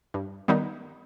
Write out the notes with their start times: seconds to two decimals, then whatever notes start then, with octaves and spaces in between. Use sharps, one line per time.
0.14 G2
0.48 D#3 G3 B3 D#4